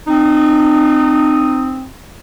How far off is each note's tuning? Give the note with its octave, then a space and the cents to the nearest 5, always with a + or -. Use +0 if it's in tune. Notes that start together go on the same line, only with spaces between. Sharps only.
C4 +0 D#4 -35 D#6 +0